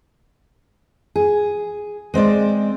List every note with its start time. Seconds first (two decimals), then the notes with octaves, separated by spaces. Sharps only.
1.16 G#4
2.14 G#3 C4 C5 D5